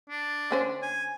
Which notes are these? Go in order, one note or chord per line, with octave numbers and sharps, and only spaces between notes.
D4
D3 C#4 C5
G#5